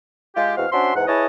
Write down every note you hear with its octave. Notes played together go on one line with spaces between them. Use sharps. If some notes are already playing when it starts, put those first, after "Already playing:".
G#3 F4 G4
E2 G#3 C4 F#4 F5
C#4 D4 F#4 C5 E5 C6
E2 G#2 F#5
E4 G#4 B4 C#5 D#5 A5